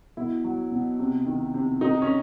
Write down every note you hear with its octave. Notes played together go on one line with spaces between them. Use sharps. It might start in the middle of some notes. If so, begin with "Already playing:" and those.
B2 E4
F#3
B2
C3
D#3
C3
C3 D#4
C#4